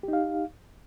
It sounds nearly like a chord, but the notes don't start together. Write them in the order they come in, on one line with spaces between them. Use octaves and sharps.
G4 D#4 F5